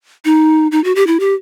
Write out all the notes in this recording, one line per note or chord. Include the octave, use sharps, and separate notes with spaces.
D#4
D#4
F#4
G4
E4
G4